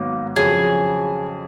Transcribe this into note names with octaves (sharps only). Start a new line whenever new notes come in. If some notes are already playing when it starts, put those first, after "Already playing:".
Already playing: G#2 D#3 F#3 A#3 B3
F2 C#3 F#3 G#4